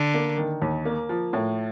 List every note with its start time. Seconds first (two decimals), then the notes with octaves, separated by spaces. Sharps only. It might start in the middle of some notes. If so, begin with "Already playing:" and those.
Already playing: D3
0.14 A#3
0.38 D#3
0.62 D#2
0.85 A#3
1.09 F3
1.33 A2